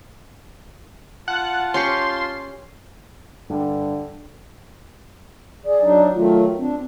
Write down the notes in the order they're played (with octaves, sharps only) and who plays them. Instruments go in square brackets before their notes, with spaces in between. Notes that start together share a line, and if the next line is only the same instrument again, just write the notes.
[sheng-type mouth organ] F4 A5 [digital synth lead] F#5
[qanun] C#4 G4 C#6 [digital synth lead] C6
[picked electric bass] G2 [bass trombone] D3
[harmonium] G#4 [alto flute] D5
[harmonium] F#3 D4 D#4
[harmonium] D#3 F#3 A3 [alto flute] F4
[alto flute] C4 [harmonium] D4